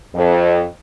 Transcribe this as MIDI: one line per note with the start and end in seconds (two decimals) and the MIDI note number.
0.14 0.63 41